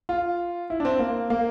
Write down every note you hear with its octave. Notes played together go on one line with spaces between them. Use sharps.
F4
E4
D4
C4
A#3
A#3